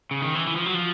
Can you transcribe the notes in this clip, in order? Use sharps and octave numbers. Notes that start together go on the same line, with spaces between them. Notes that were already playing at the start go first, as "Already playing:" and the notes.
C#3
D#3
E3
E3
F3
F#3
F3